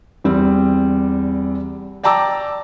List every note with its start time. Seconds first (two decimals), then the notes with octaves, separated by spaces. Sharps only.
0.24 E2 G3 C4
2.03 D5 G5 A5 A#5 D6 E6